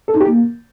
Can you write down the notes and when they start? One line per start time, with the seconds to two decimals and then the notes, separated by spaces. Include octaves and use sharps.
0.08 A4
0.14 D#4
0.21 G4
0.27 A#3